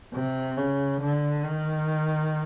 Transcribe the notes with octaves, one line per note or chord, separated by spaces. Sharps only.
C3
C#3
D3
D#3